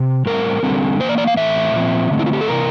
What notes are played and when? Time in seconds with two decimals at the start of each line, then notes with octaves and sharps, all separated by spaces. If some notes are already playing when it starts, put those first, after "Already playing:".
Already playing: C3
0.26 A2 G3 C4 A#4
0.63 D3 G3 C4
1.00 A#3 C5
1.04 E3 D5
1.18 D5
1.27 F5
1.37 A2 E3 A3 C4 E5
1.73 A#2 F3 C4
2.11 D3 A3 C4
2.19 E4
2.26 F4
2.33 G4
2.41 A4
2.47 C3 E3 A#3 A#4